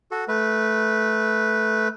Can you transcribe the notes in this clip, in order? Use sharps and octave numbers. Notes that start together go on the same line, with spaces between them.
F#4 A4
A3 B4